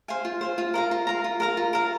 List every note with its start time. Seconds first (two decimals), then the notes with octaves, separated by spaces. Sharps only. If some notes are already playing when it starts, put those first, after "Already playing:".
0.08 C5 F5 G#5
0.25 F4
0.41 C5 F5 G#5
0.58 F4
0.74 A#4 F5 A#5
0.91 F4
1.07 A#4 F5 A#5
1.24 F4
1.40 A#4 F5 A#5
1.57 F4
1.73 A#4 F5 A#5